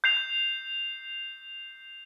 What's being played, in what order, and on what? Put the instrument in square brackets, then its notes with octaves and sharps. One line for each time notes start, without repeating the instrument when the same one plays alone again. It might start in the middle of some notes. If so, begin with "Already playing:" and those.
[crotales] G6 C7 F7